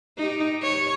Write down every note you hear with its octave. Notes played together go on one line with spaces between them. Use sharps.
D#4 G4
C#5